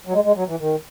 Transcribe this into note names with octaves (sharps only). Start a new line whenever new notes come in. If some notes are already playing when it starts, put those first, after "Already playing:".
F#3
G#3
G#3
F#3
E3
D#3